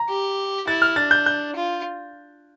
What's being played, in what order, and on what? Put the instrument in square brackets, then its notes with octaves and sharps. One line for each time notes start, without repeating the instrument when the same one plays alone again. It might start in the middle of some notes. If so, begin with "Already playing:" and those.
Already playing: [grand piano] A#5
[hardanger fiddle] G4
[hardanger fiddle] E4 [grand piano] A6
[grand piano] F6
[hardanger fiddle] D4 [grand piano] A6
[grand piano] G6
G6
[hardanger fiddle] F4